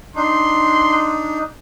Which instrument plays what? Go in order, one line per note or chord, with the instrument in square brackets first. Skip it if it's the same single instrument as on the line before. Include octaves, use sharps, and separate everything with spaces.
[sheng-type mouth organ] D4 D#4 [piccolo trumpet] C6